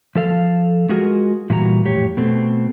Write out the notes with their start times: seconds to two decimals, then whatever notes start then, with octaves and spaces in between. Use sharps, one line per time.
0.15 F3 A4 F5
0.89 G#3 F4 F#4 G#4 A#4
1.50 A#2 E3 G3 F#4 A5 A#5
1.84 F2 A2 G4 C#5
2.17 B2 A3 C4